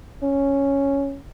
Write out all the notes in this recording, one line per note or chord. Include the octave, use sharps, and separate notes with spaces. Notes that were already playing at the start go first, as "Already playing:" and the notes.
C#4